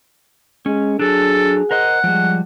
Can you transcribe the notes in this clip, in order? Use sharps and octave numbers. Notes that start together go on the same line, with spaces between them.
G#3 C#4
F#3 D4 G#4 A4
A#4 C5 D#5 F#5
F3 G3 G#3